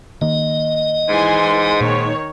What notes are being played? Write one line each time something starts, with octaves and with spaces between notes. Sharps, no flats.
D#3 A#3 D#5
G#2 E3 G#5 C6
A#2 D#3 C#5